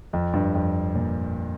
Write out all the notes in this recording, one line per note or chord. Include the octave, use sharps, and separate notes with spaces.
F2
G2
F2
A#2